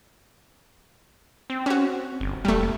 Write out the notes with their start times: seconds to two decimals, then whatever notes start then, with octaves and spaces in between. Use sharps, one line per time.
1.50 C4
1.66 C#4 F#4
2.20 G1
2.45 E1 G3 A3
2.60 F1